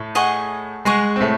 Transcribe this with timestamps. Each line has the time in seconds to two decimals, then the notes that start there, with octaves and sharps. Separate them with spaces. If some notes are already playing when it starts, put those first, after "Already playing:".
Already playing: A2 A3
0.15 G#4 D#5 F#5 C#6
0.85 G#3 G#4 D#5 F#5 C#6
1.16 C4
1.21 A2 A3